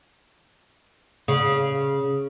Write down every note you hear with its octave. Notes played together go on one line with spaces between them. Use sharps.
C#3